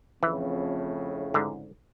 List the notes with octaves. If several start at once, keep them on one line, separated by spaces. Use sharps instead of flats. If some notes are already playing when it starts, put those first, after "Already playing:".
F2 A2 C#3 E3
G#2 D3